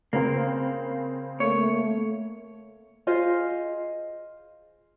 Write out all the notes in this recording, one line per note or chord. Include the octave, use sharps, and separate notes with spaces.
C#3 A#3 C4
A3 A#3 C#5
F4 G#4 C5 D#5